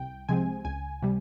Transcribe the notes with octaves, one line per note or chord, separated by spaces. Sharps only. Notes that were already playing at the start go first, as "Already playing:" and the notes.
Already playing: C2 G5
C3 F3 G#3 C4 G#5
C#2 G#5
C3 G3